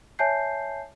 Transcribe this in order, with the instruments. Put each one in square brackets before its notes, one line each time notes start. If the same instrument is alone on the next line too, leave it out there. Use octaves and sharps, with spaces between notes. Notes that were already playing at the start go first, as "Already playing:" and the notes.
[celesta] C#5 E5 G#5 A5 G6 C7